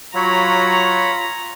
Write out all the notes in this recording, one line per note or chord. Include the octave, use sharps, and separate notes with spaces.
F#3 F4 C#5 A#5 B5